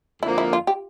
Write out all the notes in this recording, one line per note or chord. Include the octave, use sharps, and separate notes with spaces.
F2 D3 F3 A#3 E4
E4
F4
G4